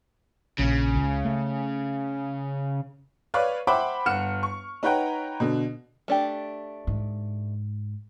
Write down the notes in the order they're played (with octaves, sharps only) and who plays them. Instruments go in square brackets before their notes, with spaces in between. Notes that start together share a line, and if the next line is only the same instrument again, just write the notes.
[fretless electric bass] A#1 [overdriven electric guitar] C#3
[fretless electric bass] C#2
A3
[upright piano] B4 C#5 D5 F5
C5 E5 F#5 G5 B5 D6
G1 F#5 F6 C#7 E7
C#6
D#4 B4 C#5 F#5 G5 A#5
B2 D3
[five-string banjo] A3 D4 G4
[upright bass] G#2